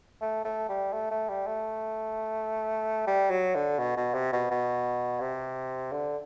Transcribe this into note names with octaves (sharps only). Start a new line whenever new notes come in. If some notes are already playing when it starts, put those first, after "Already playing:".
A3
A3
G3
A3
A3
G3
A3
G3
F#3
D3
B2
B2
C3
B2
B2
C3
D3